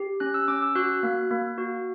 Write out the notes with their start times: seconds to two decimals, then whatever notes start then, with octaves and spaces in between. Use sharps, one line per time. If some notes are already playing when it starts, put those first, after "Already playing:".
Already playing: G4
0.20 C#4 F#6
0.34 E6
0.48 C#4 D6
0.62 E6
0.75 F#4 F#6
1.03 A#3
1.31 A#3
1.58 F#4